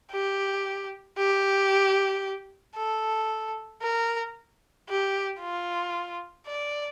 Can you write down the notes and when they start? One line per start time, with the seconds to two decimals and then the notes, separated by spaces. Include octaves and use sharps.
0.12 G4
1.18 G4
2.76 A4
3.82 A#4
4.89 G4
5.41 F4
6.47 D5